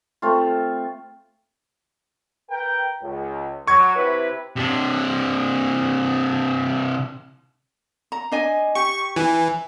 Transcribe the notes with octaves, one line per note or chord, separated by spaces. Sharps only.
A3 C4 F4
A#4 B4 G5
C#2
F#3 C#6 G#6
C3 E4 B4
C3 D4
A#5
D4 D#5 G#5
G4 C#6
E3 E4 G#5